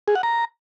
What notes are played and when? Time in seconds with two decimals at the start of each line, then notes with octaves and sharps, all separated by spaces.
0.08 G#4
0.15 F#5
0.23 A#5